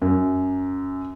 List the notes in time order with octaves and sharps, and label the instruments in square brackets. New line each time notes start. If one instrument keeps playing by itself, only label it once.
[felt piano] F#2